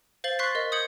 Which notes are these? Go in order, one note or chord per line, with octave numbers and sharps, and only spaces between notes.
C5 F5 A6 F#7 G7
C6 C#6 F#6 A6 B6 C7
A#4 D#5
D#6 G6 G#6 C#7 F#7